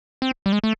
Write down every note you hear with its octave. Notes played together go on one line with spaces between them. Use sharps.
C4
G3
G#3
A3